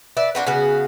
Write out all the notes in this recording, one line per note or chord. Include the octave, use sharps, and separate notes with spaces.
B4 D5 E5
F3 D4 F#4 B4
C#3 B3 F#4 G#4